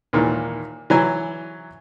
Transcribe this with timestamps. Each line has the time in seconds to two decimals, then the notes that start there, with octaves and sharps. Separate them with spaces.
0.13 D#2 A#2 D#3 E3
0.90 E3 F#3 G#5